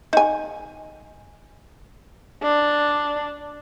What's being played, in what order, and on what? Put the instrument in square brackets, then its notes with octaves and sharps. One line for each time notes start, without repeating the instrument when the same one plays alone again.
[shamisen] D#4 G#5
[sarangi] D4